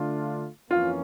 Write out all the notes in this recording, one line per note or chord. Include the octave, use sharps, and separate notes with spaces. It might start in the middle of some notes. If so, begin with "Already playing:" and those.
Already playing: D3 A3 D4 F4
F2 E3 A#3 C#4 F4